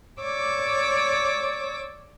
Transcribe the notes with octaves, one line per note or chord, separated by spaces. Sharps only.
C#5 D5 D6 E6